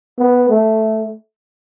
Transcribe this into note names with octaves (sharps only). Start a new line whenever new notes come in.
B3
A3